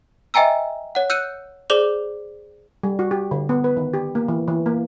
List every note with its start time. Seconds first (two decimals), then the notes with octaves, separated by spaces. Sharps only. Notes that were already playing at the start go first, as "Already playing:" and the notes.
0.34 D#5 E5 G5 G#5 A#5 E6
0.95 C#5 F#5
1.10 E6 F#6 G6 C#7 D#7
1.70 G#4 C5 D5 D6 F7 F#7
2.83 G3
2.99 F#4
3.11 G4
3.31 D3
3.49 B3
3.64 B4
3.77 D#3
3.94 G4
4.15 A#3
4.28 E3
4.48 E3
4.66 A#3